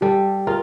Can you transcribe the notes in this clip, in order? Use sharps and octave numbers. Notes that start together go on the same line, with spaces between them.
G3 G4 A4
F4 G#4 A#4